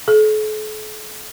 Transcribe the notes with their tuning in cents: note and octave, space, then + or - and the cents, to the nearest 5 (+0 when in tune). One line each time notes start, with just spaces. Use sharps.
A4 -45